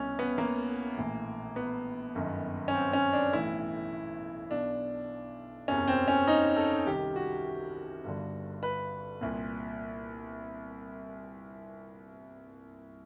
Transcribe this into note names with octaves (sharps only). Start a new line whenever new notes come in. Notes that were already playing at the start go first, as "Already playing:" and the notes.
Already playing: C2 B2 C#4
B3
A#3
A#1 A2 E3
B3
G1 F#2 D#3
C#4
C4
C#4
D4
B1 A2 E3 E4
B1 B2 D4
F#1 E2 C3 C#4
C4
C#4
D#4
A4
C2 C3 D#3 G4
F#4
G1 G2 D3
B4
C2 A#2